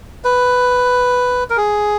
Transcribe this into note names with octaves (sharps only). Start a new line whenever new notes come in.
B4
A#4
G#4